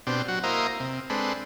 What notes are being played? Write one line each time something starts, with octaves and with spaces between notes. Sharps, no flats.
B2 C4 D4 G4
F#3 F#4
A#3 E4 C5 D#5 F5 A#5
C3
G#3 C4 D4 A4 B4